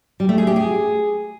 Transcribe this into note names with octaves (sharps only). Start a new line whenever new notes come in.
G3
A3
G#4
G4
G#4